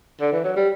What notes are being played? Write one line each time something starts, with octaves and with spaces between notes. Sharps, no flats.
D3
E3
F#3
G3